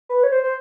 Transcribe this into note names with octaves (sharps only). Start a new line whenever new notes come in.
B4
C#5
C5
C5